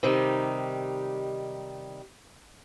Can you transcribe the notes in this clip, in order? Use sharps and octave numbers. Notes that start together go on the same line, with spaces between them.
C3 D#3 G3 D#4